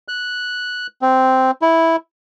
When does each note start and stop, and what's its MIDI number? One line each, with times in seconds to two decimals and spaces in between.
0.08 0.87 90
1.02 1.51 60
1.62 1.96 64